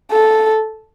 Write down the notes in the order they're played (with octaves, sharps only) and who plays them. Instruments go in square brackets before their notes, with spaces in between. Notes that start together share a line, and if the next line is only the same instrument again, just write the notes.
[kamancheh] A4